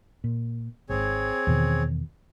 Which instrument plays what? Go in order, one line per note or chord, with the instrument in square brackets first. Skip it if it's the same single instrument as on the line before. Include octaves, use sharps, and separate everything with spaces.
[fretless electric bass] A#2
[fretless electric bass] G#1 G#2 [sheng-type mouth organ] C4 G#4 C#5
[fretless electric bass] E2 B2 D#3